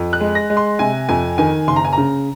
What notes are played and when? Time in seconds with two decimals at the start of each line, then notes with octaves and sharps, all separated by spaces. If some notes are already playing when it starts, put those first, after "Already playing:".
Already playing: F2
0.13 F#6
0.20 G#3
0.35 A#6
0.50 G#3
0.57 C6
0.79 C3 G#5
1.09 F2 G#5
1.38 D#3 G#5
1.67 F#1 C6
1.76 A#5
1.85 G#5
1.93 A#5
1.98 C#3